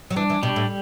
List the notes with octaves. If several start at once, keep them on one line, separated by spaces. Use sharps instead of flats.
F#3
E3 D4
E3
B2 G3
A2